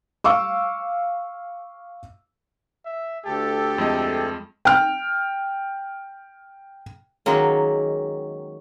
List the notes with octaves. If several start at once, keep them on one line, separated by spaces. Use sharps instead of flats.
F5 C#6 D6 E6
E5
D2 G4 A4
F2 G#3 D#5
G5 F6
D#3 F#3 G#3 A#3 C#4